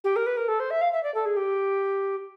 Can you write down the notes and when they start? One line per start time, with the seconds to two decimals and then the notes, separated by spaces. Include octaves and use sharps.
0.04 G4
0.16 A#4
0.26 B4
0.37 A#4
0.48 A4
0.59 C5
0.70 E5
0.81 F5
0.92 E5
1.03 D5
1.14 A4
1.25 G#4
1.36 G4